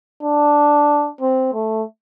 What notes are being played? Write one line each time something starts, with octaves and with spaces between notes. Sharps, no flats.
D4
C4
A3